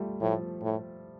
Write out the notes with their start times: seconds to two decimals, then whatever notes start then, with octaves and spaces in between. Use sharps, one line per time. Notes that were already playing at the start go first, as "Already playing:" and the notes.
Already playing: G3 A3 F4
0.21 A2 F3
0.62 A2